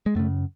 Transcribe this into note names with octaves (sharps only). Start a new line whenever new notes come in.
G#3
F#2 C#3 A3